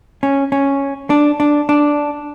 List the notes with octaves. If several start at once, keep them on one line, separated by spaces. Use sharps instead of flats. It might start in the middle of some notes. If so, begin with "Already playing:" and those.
C#4
C#4
D4
D4
D4